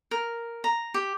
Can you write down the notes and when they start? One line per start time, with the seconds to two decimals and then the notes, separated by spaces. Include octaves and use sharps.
0.11 A#4
0.64 A#5
0.94 G4